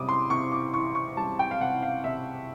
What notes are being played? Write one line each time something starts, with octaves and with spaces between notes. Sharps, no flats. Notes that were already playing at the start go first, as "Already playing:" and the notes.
Already playing: C3 G3 D6 D#6
C6
C3 C#6
D6
E3 C#6
C#6
G3 A5
G5
F5
C3 F#5
F5
C3 E5